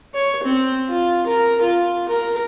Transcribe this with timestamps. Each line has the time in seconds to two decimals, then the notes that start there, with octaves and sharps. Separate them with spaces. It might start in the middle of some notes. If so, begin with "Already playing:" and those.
0.14 C#5
0.43 C4
0.88 F4
1.27 A#4
1.62 F4
2.09 A#4